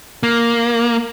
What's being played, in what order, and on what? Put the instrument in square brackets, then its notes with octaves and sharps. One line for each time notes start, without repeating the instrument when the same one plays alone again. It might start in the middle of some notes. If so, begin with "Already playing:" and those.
[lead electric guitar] A#3